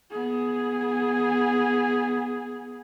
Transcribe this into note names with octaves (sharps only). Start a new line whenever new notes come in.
B3 G#4